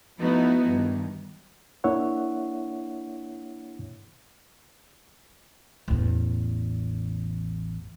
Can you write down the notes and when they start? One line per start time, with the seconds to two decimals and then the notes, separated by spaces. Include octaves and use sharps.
0.18 F3 A3 B3 D#4 E4 F#4
0.69 G2 D#3
1.84 A#3 D4 E4 C#5 E5 F#5
5.88 A1 E2